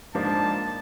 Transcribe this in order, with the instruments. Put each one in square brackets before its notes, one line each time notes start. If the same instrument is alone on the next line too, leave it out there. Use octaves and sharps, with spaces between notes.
[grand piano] G#2 F3 A#3 D4 [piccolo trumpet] A5